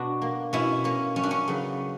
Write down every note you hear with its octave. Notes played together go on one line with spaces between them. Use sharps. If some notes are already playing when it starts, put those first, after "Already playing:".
Already playing: B2 B3 D4 F#4
A#3
B2 C#4 E4
A#3 C#4
F#2 C#4
D4
C#4
C#3 F#3 B3